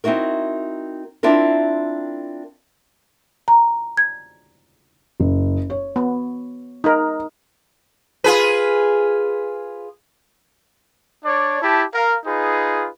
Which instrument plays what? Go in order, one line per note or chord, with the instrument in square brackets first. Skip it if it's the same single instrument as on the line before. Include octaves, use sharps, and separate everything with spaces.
[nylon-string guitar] C4 D#4 E4 F#4 A#4
C4 D4 E4 F4 A#4
[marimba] A#5
G#6
[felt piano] F#1
C#5
[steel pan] B3
D#4 A#4
[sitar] F4 G#4 B4
[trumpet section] D4 C#5 D5
E4 G4 A5
A#4 F5
D#4 F4 G#4 B4